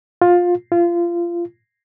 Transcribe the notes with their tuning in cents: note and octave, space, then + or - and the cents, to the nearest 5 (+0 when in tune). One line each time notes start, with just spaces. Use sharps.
F4 +15
F4 -25